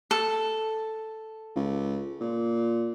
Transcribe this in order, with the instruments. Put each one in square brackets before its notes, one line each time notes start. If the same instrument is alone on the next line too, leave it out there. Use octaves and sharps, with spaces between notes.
[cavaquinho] A4
[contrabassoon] C#2
A#2